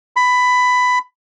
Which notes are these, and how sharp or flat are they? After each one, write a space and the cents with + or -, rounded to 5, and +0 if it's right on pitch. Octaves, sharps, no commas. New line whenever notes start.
B5 +15